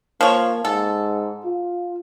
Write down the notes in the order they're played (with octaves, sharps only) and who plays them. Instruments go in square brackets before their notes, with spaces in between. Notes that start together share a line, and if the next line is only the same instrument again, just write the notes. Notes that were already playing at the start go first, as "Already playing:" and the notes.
[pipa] F3 C#5 [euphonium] A#3
[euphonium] G#2 [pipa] A4
[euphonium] F4